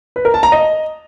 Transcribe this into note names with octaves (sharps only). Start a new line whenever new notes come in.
B4
A#4
A5
A#5
D#5